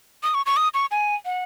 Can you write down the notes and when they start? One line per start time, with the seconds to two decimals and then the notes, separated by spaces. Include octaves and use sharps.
0.23 D#6
0.34 C#6
0.46 C#6
0.57 D#6
0.74 C#6
0.91 G#5
1.25 F#5